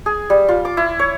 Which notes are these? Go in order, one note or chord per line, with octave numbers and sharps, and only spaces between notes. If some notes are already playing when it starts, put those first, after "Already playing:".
G#4
G3
F4
D6
E4
C#5